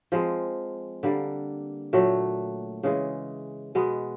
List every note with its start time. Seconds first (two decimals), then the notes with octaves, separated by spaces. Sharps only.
0.12 F3 G#3 C4
1.03 D3 G3 A#3
1.93 A#2 F#3 A3
2.83 C#3 E3 G#3
3.75 B2 G#3 B3